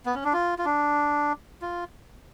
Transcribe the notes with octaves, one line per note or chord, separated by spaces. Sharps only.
B3
C#4
D4
F4
F4
D4
F4